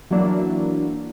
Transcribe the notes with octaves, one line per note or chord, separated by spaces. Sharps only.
E3 F#3 A#3 D4 E4